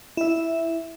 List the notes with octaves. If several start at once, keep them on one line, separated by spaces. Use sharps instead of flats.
E4 E5